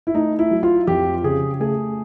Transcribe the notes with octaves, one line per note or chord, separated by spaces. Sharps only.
E4
A3 D#4
E4
F#3
F4
F2 G4
C#3 G#4
A3 G#4